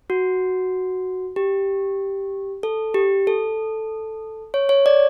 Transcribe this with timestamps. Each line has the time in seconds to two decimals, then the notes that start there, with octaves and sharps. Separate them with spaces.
0.10 F#4
1.36 G4
2.63 A4
2.94 G4
3.27 A4
4.54 C#5
4.69 C#5
4.86 D5